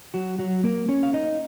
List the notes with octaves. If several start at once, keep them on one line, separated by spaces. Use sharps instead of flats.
F#3 F#4
F#3 F#4
A#3 A#4
C#4 C#5
F5
D#4 D#5